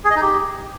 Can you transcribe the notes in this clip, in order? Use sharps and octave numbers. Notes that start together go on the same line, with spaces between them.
G#4
D#5
D#4
G4